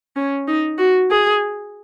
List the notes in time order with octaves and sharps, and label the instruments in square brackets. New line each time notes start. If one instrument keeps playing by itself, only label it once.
[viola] C#4
D#4
F#4
G#4